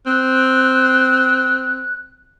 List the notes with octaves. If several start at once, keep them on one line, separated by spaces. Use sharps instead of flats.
C4 F#6